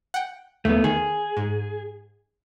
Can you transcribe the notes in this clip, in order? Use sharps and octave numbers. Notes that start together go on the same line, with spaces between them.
F#5 G5
D#2 A3 B3
D#3 G#4
G#2